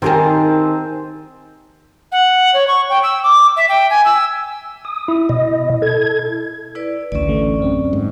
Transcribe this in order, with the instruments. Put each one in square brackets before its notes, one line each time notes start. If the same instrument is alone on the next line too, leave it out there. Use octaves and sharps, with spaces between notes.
[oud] D#3 G4 A#4 [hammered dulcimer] C4 G#4 A5
[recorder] F#5
C#5
C#6
G5
E6
D6
E5
G5
G#5
E6
[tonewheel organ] D#6
[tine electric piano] E4
[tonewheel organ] B2 D#5
A4 G#6
[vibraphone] E4 B4 D5
[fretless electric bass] A1 D2 [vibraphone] C#4 D5
[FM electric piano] D3 E3 A3
F#2 C4
[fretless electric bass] G#2